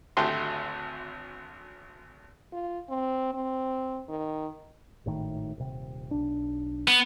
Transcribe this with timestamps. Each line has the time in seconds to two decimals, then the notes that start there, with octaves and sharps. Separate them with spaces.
0.17 G#1 D2 A3 G4 C6
2.52 F4
2.89 C4
3.34 C4
4.09 D#3
5.06 G#1 A2 D#3
5.58 D#1 C3
6.11 B1 D4
6.88 B3